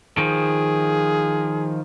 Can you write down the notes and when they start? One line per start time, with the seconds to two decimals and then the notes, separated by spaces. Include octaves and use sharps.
0.18 D#3 F3 G#4